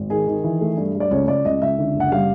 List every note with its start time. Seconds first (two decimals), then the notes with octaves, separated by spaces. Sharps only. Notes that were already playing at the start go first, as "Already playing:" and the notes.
Already playing: G#1
0.10 D#3 G#4
0.27 D#3
0.44 E3
0.61 A3
0.77 G2
0.95 A3
1.00 D5
1.11 C#2 C#5
1.27 C#2 D5
1.45 C#2 D#5
1.61 C#2 E5
1.79 D3
1.94 F#1
2.00 F#5
2.12 G3 F5